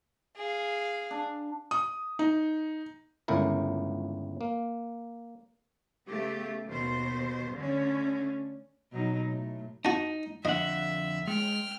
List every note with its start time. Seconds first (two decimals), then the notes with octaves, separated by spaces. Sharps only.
0.37 G#4 F5
1.11 D4
1.71 D#6
2.19 D#4
3.28 G1 C#2 A2 E4 A#4
4.41 A#3
6.08 C#3 A3 B3 G4
6.68 D#2 B2 C5
7.55 D3 A3 C#4
8.92 B2 F#3 D#4
9.31 A2
9.85 D#4 F#4 A5
10.45 F2 D3 D#5 E5 F#5
11.27 G#3 G5 F6